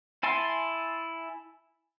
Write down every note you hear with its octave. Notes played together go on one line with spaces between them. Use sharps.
E4 G#5 A5 C6